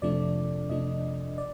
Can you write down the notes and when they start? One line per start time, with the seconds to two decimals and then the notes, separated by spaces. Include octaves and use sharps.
0.02 F2 C3 F3 A3 D4 D5
0.70 F2 C3 F3 A3 D4 D#5
1.38 D5